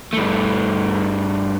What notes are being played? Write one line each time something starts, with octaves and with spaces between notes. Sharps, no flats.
G2 A3